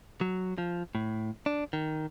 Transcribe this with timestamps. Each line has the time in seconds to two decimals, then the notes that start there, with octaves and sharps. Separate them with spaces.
0.21 F#3
0.58 F3
0.95 A2
1.46 D4
1.73 D#3